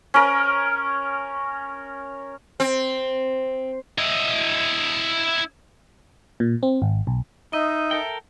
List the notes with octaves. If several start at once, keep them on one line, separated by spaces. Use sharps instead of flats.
C#4 A#4
C4
E4 D#5
A#2
C4
G#1
B1
D#4 D#5 E5
A4 A#4 G5